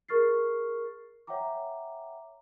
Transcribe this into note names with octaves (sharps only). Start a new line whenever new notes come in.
G#4 A#4 C#6 F6 A6 C7
C#5 E5 F#5 G5 A#5 D6